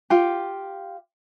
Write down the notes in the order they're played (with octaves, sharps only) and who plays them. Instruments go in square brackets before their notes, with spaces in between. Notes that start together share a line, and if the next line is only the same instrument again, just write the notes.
[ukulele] F4 G4